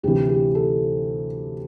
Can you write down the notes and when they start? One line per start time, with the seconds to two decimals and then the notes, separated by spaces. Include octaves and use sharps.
0.03 D2 C3 E3 G4
0.29 G4
0.55 A4